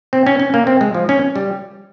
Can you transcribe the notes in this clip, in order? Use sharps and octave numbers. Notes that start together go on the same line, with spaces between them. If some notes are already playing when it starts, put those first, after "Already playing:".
C4
C#4
C#4
A#3
C4
G#3
F3
C#4
G3